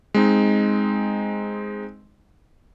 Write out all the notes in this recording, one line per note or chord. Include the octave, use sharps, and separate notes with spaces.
G#3 C4 D#4